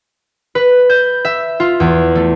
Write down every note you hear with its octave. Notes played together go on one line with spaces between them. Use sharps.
B4
G6
E5
F4
E2
A3